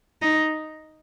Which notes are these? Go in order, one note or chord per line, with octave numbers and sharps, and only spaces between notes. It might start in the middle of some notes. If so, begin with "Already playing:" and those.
D#4